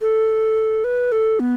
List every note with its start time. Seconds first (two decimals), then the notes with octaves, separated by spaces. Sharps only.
0.01 A4
0.84 B4
1.12 A4
1.40 B3